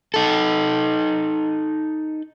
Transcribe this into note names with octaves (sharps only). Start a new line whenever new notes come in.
D#4 A4